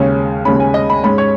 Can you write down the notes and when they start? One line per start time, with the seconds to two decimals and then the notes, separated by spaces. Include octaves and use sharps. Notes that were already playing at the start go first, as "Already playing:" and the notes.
Already playing: D#2 C#3 G#3 C#4
0.45 D#2 C#3 G#3 C#4 B5
0.60 G#5
0.74 D#5
0.90 B5
1.03 G#2 G#3 C#4 B5
1.18 C#5